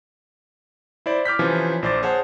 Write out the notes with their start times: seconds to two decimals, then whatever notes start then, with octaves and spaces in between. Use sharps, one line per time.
1.06 E4 C5 D5
1.25 D6 F6 G6 B6
1.39 C3 E3 F3 C#4
1.83 A#1 C5 D5 D6 A6
2.02 G#4 C5 C#5 F#5 A5